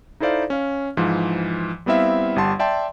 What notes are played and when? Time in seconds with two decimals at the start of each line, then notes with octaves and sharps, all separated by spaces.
0.20 D#4 E4 A4 C5 D5 F5
0.50 C#4 F5
0.97 G#2 E3 F3
1.86 G3 B3 C4 E4 E5 F5
2.36 G1 G3 F#5 A5 C6
2.59 D5 E5 G5 A5 C6